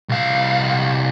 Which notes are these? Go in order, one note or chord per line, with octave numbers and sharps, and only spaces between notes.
C2 F5